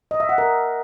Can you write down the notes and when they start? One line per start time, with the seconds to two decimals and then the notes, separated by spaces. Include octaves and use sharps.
0.11 D#5
0.20 E5
0.29 F#5
0.38 A#4